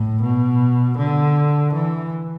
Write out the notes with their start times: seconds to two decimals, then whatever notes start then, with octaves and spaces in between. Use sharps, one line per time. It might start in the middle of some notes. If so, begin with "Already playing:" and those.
Already playing: A2
0.22 B2
0.98 D3
1.73 E3